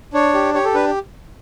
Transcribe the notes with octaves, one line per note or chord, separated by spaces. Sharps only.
D4 C#5
G4
G4 C#5
A4
D4 B4